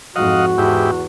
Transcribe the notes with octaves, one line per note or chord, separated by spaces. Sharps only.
F2 G#2 F#4 D#5 F5 F#5
E2 G#2 E4 G4